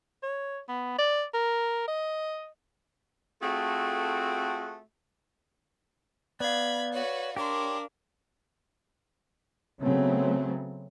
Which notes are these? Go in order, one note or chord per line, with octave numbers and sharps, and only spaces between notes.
C#5
B3
D5
A#4
D#5
A3 C4 F4 F#4 G#4 A4
B3 D5 F5 B5 G#6
F#4 B4 C#5
D4 G4 A#4 C#5 C6 D6
C#3 F#3 A3 B3 C4